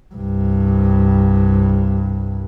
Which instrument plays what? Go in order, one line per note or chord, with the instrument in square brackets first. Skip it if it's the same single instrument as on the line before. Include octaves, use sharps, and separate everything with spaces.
[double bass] C2 G2